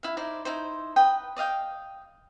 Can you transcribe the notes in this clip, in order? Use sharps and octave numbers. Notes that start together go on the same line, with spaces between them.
E4 F5
D#4 E4 C5 D5
D#4 E4 C5
B4 D#5 G5
D5 D#5 F5 G5